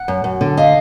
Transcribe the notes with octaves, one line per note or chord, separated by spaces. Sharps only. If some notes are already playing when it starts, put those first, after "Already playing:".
Already playing: F#5
F#2
F#2
D3
D#5 F5